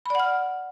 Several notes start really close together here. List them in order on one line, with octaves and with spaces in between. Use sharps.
B5 D5 F#5 F6